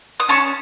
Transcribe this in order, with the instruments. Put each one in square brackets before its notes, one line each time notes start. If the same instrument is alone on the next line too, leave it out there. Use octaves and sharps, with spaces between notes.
[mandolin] D#6
C#4 A5 C#6